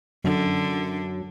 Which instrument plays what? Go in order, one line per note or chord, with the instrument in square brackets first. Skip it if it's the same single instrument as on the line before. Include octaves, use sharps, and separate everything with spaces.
[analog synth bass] F#2 [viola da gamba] D3